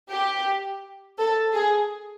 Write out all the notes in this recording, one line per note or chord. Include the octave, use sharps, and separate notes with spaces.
G4
A4
G#4